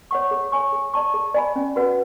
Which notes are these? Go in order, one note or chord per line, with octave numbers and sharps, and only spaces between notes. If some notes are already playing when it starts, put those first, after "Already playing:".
C#5 F#5 C#6
G#4
C#5 G#5 C#6
G#4
D5 A5 C#6
G#4
D5 G#5 B5
C#4
F#4 B4 D5 F#5